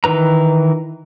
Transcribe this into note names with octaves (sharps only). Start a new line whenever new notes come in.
D#3 E3 B4 A#5